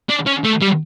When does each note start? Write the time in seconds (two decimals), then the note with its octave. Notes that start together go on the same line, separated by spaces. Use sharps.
0.10 D4
0.27 C#4
0.45 A3
0.62 G3